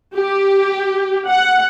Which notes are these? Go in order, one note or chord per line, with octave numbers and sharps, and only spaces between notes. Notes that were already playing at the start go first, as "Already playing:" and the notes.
G4
F#5